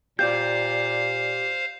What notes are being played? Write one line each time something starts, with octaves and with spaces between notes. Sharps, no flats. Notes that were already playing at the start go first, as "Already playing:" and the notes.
A#2 G4 C5 D5 F5 G6